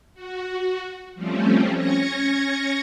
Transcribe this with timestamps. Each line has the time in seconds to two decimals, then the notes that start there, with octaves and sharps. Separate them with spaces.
0.14 F#4
1.15 F3 G3 A3 C4 C#4
1.77 C#4 G#6 A#6 C#7